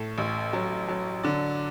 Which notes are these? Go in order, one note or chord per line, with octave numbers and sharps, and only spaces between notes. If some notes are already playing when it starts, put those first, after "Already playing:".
Already playing: A2 A4
A1
F#3
F#3
D3 D5